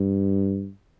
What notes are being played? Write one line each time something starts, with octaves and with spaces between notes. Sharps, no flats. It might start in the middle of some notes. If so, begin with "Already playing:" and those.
Already playing: G2